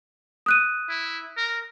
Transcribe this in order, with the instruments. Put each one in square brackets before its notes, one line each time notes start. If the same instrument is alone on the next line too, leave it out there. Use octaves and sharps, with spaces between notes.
[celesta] D#6 F#6 D#7
[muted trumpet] E4
A#4